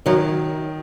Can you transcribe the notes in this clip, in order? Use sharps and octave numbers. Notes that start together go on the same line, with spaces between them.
F#2 D#3 F#3